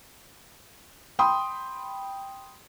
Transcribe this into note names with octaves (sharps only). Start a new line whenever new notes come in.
G5 B5 C6 D#6